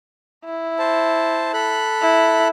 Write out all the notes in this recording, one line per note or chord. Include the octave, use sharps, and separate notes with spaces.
E4
C5 A5
A4 B5 F#6
E4